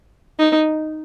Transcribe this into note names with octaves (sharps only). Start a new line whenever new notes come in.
D#4